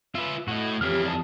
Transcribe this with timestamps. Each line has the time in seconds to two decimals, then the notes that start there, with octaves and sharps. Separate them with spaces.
0.15 F4 B4 E5
0.48 A2 F#4 D#5
0.81 F2 E3 G4 C#5 F6
1.06 D5 A5 D#6